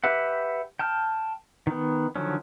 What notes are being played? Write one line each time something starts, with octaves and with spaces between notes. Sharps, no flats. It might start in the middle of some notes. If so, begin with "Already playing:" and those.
G4 B4 E5 F#5
G5 A5 F6
D#3 B3
D3 D#3 F3 F#3 C#4